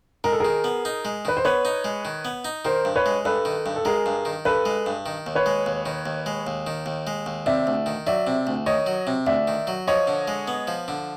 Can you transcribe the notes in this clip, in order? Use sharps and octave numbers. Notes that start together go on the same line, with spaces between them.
G#3 A#4
A4
D#3 G#4 A#4
B3
D#4
G#3
D#3 B4
C5
B3 B4 C#5
D#4
G#3
D#3
B3
D#4
D#3 A#4 C5
G2
B4 C#5
G#3
G2 A4 B4
D#3
G2
A4
G#3 G#4 A#4
G2
D#3
G2 A4 B4
G#3
G2
D#3
D#2
B4 C#5
G#3
D#2
D#3
D#2
G#3
D#2
D#3
D#2
G#3
D#2
C3 D5 E5
D2
D#3
F#3 D5 E5
C3
D2
D#3 C#5 D#5
F#3
C3
D2 D5 E5
D#3
F#3
F3 C#5 D#5
D3
G#3
B3
F3
D3